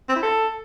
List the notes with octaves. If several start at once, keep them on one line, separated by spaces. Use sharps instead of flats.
C4
E4
A4